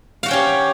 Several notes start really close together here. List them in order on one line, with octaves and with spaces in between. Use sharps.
F5 F#4 G5 C#4 G4